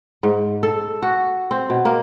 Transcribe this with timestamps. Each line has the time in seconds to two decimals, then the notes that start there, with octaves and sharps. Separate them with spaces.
0.23 G#2
0.63 A4
1.02 F#4
1.51 C4
1.70 B2
1.85 A#3